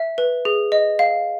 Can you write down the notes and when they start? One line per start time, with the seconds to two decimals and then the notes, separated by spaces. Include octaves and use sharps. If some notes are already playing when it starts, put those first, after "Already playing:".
Already playing: E5
0.18 B4
0.45 G#4
0.72 D#5
0.99 F5